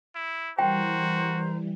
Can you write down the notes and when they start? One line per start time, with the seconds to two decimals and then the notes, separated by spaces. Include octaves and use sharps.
0.15 E4
0.59 E3 G3 F#4 A#4 C5 G5 A#5